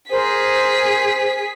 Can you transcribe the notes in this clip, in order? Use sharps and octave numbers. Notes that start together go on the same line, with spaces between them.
G#4 A#4 C5 B6